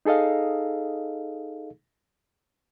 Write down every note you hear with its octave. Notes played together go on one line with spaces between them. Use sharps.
D#4 G#4 A4 D#5 F5